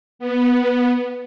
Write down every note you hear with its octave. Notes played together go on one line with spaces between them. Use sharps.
B3